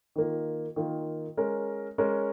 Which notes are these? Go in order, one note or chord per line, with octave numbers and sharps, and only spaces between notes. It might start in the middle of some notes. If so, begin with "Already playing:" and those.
D#3 A#3 F4
D#3 A#3 F4
G#3 C#4 A#4
G#3 C#4 A#4